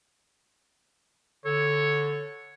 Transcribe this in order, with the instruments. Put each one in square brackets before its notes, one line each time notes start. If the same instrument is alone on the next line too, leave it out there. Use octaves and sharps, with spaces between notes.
[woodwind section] D3 A4 [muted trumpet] C#5